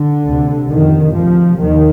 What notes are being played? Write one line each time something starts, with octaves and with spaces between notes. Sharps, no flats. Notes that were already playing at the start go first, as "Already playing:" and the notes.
Already playing: D3
D2 C3
F2 C3 D#3
D2 C3 F3
D#2 D#3